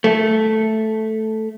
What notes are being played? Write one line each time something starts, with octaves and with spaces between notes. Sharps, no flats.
A3